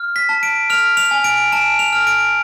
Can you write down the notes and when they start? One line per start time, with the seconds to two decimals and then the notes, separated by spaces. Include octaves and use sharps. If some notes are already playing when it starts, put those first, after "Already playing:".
Already playing: F6
0.16 B6
0.29 A5
0.43 D7
0.70 F6 F7
0.97 F7
1.11 G#5
1.24 D7
1.52 A5 D7
1.79 F7
1.93 F6
2.07 D7